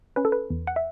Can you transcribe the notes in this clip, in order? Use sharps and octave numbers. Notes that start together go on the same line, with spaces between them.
C#4 B4
A4
B4
E2
F#5
E5